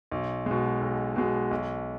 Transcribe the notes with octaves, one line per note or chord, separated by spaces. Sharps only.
B1
B2 G#3
B1
B2 G#3
B1